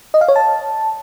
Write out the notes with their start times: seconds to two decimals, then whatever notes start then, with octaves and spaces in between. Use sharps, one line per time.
0.14 D#5
0.21 F5
0.28 C#5
0.36 A5